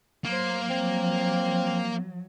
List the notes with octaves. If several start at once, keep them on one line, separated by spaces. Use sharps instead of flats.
F#3 A#3 C5
F3 F#3 C4